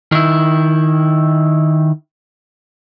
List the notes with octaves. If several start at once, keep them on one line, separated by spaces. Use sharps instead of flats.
D#3 E4